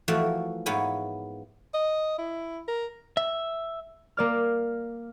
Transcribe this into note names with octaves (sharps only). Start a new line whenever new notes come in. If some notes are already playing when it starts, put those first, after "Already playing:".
E3 F3 A3 A#3 F#4
G#2 A#3 B3 E4 C#5 G#5
D#5
E4
A#4
E5
A#3 D5 F6